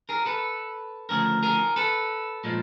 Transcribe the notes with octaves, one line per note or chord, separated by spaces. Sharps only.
G#4 A#4
A4 B4
D2 C#3 F3 A3 G#4 A#4
G#4 A#4
A4 B4
A#2 F3 G#3